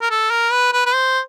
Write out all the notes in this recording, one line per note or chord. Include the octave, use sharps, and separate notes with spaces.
A#4
A4
A#4
B4
B4
B4
C5